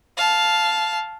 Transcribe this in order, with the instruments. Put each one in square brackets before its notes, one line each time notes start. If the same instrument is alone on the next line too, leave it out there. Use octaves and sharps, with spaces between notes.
[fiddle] F5 A5